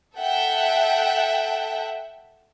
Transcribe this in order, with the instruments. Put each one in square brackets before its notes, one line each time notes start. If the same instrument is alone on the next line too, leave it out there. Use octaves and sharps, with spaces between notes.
[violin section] A4 E5 F#5 G5